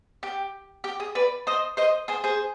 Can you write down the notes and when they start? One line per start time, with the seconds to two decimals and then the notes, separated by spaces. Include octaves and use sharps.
0.23 G4
0.84 G4
1.00 G#4
1.15 B4 D5
1.47 C5 D#5
1.77 C5 D#5
2.08 G#4 C5
2.24 G#4 C5